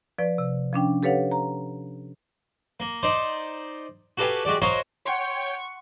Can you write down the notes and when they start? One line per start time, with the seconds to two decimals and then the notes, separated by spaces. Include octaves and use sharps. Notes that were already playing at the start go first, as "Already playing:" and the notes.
0.18 F3 B4 D5
0.38 C3
0.73 F3 C#4 D4 G5
1.03 G4 A4 B4 C#5 F5 F#5
1.31 A#5
2.80 A#3
3.03 D#4 C5 D5
4.18 F#4 G4 A4 B4 F5 G#5
4.45 G#3 F#4 G4 D5
4.62 F#4 A#4 C5 C#5 D#5 F5
5.05 C#5 F#5 G5 C6 C#6